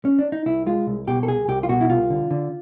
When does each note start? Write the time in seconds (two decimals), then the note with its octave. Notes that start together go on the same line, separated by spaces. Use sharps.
0.05 C#4
0.19 D4
0.32 D#4
0.46 C2 E4
0.66 G#3 F4
0.87 C2
1.07 B2 G4
1.23 A4
1.28 C2 G#4
1.48 C2 G4
1.63 F4
1.69 B2 F#4
1.81 E4
1.89 C2 F4
2.10 D3
2.31 D3